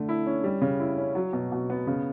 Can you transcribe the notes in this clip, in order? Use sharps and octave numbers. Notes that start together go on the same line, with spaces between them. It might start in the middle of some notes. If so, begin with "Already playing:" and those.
Already playing: D3 A3
E4
C#4
G3
C#3
E4
C#4
F#3
B2
B2
B3
C#3